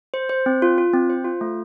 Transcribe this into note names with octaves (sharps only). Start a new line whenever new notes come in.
C5
C5
C4
F4
F4
C4
C5
F4
A3